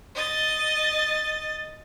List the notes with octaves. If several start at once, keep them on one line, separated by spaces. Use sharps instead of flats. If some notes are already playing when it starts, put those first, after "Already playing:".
D#5 A6